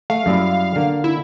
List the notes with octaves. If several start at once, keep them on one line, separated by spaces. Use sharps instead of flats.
A3 F5
F#2 G3 E4
D3 A#3
E4